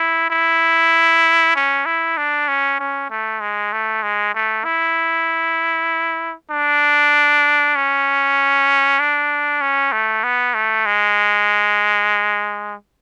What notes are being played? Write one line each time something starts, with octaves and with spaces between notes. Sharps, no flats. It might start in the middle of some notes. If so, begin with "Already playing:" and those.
Already playing: E4
E4
C#4
E4
D4
C#4
C#4
A3
G#3
A3
G#3
A3
E4
D4
C#4
D4
C#4
A3
B3
A3
G#3